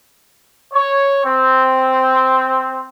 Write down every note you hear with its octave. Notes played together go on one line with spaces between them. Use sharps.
C#5
C4